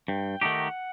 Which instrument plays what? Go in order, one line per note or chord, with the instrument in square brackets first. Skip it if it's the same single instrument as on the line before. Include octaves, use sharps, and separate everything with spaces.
[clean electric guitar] G2 [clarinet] G5
[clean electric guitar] D#3 A3 D#4 G4 [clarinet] F#5